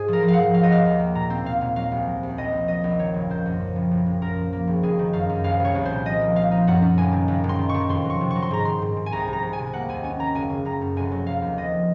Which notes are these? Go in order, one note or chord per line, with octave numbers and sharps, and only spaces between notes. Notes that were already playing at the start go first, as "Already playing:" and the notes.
Already playing: G#2 G#4
F3 A#4
F3
F5
G#2 F#5
F#3 F5
D#5
F#3 F5
D#2
A#3
A#2 A#5
C4
A#2 F5
A#2
F#3 F5
C2
F#3
C2
A#1 D#5
A#1
F#3 D#5
A#1
D#3 C#5
F#1
D#3 C5
F#2
F3
F#1
F#1
F#1
F#2 A#4
F3
A#3
G#1
F#1 G#4
D#3
F#2 F5
F#2
C2 F5
C2 C#5
C2
A#2 C5
F3 D#5
A#3
F3 F5
D#4
F#2 F#5
F#2
F#1 G#5
D#3
F#1
F#1
C6
D#3
C#6
D#3
F2 C6
F#3 C#6
C3
F#3 C#6
C6
G#2 A#5
D#3 C6
G#2
G#2
G#5
C2 A#5
C2
A#5
C2
G#5
C3
A#3 F#5
D#2 G#5
C#4 G#5
D#3 A#5
F#1 G#5
C#3
F#1 A#5
F#2
F1 G#5
F#3
F1 F5
D#2
F3 D#5